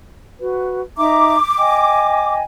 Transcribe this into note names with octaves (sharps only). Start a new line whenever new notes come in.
F#4 B4
D#4 E5 A#5 D6
D#5 G5 G#5